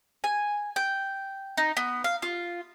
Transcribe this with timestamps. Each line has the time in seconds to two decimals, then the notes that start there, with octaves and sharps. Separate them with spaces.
0.24 G#5
0.76 G5
1.58 D#4
1.77 B3
2.04 F5
2.22 F4